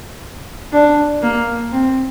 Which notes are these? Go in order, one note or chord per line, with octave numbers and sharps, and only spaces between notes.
D4
A#3
C4